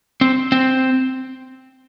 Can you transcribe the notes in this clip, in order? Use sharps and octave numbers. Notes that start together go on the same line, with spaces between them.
C4
C4